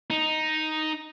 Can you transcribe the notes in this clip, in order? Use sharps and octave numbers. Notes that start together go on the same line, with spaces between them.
D#4